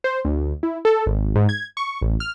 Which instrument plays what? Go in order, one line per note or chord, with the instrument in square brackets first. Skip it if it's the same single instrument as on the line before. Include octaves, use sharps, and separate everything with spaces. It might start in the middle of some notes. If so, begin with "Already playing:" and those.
[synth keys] C5
D2
E4
A4
G#1
G#2
G#6
C#6
A1
F6